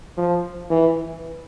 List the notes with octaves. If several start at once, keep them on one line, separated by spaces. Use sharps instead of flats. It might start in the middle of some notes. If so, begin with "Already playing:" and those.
F3
E3